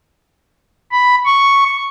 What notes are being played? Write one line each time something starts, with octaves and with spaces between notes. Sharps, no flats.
B5
C#6